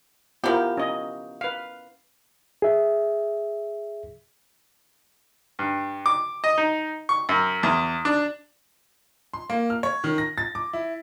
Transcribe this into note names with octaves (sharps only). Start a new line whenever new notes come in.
F3 B3 E4 G4 A#4
C#4 D#5
B4 F5
G#4 E5
G2
D6
D#5
D#4
C#6
F#2
E2
D4
C6
A#3
F6
C#5
D#3
A#6
A6
D6
E4